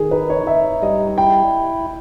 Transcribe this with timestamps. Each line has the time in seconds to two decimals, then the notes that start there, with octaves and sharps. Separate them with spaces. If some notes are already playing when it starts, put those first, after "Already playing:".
Already playing: D#3 G#4
0.11 D#4 B4
0.30 C#5
0.47 D#4 E5
0.82 G3 D#5
1.18 E4 G5